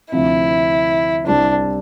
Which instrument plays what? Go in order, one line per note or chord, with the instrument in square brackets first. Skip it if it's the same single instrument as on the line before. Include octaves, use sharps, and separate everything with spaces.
[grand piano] D2 C3 F3 C4 [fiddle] E4
[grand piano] C2 C3 G3 C4 E4 [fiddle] D4